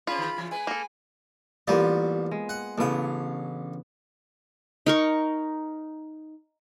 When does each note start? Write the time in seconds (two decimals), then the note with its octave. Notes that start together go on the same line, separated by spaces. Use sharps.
0.07 C4 C#4 F4 G#4 B5
0.19 D3
0.37 C#3 E3 E4
0.51 G#3 B4 G#5
0.67 A#3 A4
1.68 A1 G3 A#3 B3 F4 C5
2.31 G#3
2.49 F#5
2.78 A1 C#3 B3 D4 F5
4.86 D#4 A#4 C#6